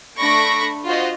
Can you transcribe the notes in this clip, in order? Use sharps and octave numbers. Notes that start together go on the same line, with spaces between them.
A3 D4 B5 C#6 A#6 D7
F4 F#4 C5 D#5